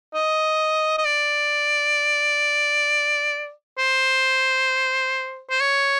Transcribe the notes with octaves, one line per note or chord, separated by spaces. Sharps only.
D#5
D#5
D5
C5
C5
C#5